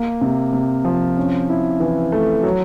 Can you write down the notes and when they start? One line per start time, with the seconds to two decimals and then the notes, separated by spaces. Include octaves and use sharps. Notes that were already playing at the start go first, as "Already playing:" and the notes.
Already playing: A#3
0.21 C3
0.53 C3
0.85 F3
1.17 C#4
1.49 E4
1.80 E3
2.12 A3
2.43 F#3